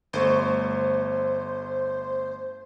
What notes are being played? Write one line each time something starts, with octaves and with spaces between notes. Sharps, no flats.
G1 A3 C5 C#6